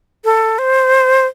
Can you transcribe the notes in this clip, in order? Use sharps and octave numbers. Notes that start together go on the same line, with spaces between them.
A4
C5